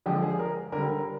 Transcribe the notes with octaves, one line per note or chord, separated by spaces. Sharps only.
D3 F3 G#3 G4
G#4
A#4
D3 G3 A#4
A#4